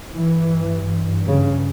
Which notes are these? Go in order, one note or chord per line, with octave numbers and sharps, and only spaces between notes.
G2 E3
C#3